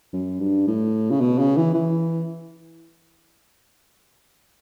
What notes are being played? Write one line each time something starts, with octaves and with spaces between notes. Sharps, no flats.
F#2
G2
A2
C#3
B2
C#3
E3
E3